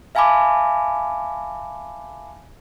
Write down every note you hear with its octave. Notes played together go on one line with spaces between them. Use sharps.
E5 F5 G#5 A5 B5 D6